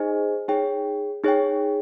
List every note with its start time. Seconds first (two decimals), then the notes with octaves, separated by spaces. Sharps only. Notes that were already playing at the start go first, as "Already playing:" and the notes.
Already playing: D#4 G#4 C5 D#5 G#5
0.48 D#4 G#4 C#5 G5
1.24 D#4 G#4 C#5 G5